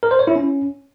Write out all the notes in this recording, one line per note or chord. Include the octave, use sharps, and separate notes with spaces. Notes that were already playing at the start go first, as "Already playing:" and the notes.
A#4
C5
C#5
E4
C#4